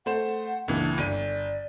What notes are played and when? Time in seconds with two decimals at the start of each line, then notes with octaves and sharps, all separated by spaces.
0.06 A3 C5 F#5 E7
0.68 C#2 A#2 E3 D4
0.98 G1 D5 D#7